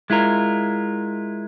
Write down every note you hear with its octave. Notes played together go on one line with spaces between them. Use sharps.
G#3 E4 F4 A#4